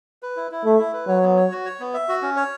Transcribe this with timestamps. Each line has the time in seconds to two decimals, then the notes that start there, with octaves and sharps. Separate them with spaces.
0.23 B4
0.36 E4
0.51 E4
0.65 A3 E5
0.79 E4
0.93 B4
1.08 F#3 C#5
1.23 B3
1.37 C#5
1.51 F#4
1.65 C#5
1.80 B3
1.94 E5
2.09 F#4
2.22 C#4
2.36 C#5